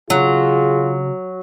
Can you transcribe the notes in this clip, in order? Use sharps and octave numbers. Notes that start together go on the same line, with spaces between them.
C#3 F#3 C4 D4 F4 G#4